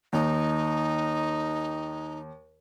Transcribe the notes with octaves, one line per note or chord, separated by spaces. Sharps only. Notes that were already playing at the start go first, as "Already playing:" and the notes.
D#2 D#4